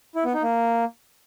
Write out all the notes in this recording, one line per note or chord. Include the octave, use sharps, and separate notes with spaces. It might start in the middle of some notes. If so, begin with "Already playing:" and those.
E4
B3
D#4
A#3